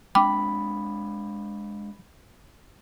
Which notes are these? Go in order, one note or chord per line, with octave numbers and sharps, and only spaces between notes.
G#3 C4 D4 G5 B5 D6